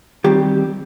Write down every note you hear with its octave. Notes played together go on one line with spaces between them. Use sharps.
D#3 G3 C4 G4